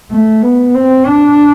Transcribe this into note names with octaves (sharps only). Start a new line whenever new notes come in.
A3
B3
C4
D4